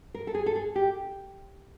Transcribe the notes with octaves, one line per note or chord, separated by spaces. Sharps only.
A#4
A4
G#4
A4
G#4
G4